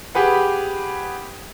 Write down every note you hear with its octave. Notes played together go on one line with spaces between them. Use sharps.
G4 G#4 B4 F#5